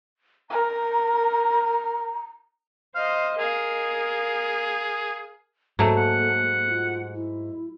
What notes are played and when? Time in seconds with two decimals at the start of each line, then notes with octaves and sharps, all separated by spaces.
0.50 A#4 A#5
2.95 C5 D#5 F5
3.38 G#4 A#4 F5
5.79 G#2 F#3 A3 A#3
5.97 F#5
6.69 F4
7.15 E4